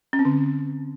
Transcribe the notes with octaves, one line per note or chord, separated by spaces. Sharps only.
C#4
C4
D3